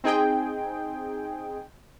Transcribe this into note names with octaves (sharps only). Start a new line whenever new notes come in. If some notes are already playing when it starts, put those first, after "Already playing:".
C4 D#4 G#4 G5